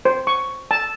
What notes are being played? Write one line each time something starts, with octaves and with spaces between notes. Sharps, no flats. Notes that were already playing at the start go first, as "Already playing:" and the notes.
C5
C#6
A5